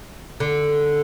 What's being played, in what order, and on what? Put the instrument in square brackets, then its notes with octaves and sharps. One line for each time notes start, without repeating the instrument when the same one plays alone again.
[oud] D3